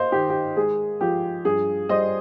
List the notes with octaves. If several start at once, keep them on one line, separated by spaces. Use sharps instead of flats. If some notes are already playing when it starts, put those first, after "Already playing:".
Already playing: G#2 A#3 C5 D#5 F5
D#3 G4
G4
G#3 G#4
F3 G4
G2 G#4
G3 C5 D#5